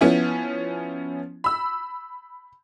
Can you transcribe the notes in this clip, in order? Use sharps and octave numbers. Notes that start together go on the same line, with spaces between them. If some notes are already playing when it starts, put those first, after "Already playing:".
F3 B3 C#4 E4
B5 E6